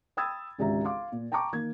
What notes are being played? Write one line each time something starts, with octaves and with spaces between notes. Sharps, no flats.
G5 B5 D#6 E6 G#6 A6
G#1 C#2 G4 E5 A#5
F5 C6 D6
A#2
G5 A5 A#5 C#6 D6
D#3 A#3 G#6